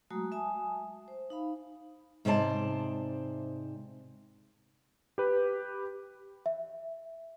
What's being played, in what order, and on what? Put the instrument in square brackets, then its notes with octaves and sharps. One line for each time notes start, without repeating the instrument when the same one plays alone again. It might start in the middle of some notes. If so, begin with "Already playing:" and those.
[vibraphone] F#3 G#3 A3 F#4 A#5 D#6
E5 G#5 A5 D#6
C5
D#4 F5 B5
[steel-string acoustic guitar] G#2 C3 C5 D5 A5
[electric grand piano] G4 B4
[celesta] E5